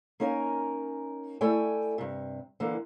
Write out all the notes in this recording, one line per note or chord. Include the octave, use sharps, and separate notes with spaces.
A#3 C#4 D#4 A#4 G#5
A3 E4 A4 D5 G5 G#5
G2 C3
D3 E3 A#3